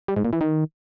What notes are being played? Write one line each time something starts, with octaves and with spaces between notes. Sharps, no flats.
G3
G#2
A#2
E3
D#3